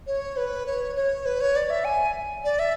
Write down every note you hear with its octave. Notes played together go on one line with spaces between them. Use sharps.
C#5
B4
C#5
C#5
B4
C#5
D5
E5
G#5
D5
E5